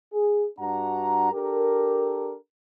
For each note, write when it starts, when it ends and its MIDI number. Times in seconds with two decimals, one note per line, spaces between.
0.13 0.47 68
0.59 1.30 43
0.59 1.30 62
0.59 1.30 66
0.59 1.30 78
0.59 1.30 82
1.32 2.35 62
1.32 2.35 67
1.32 2.35 69
1.32 2.35 70